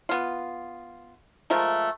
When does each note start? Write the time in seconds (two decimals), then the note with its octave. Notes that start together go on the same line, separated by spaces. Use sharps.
0.09 B3 F4
1.50 F3 G#3 A3 A#4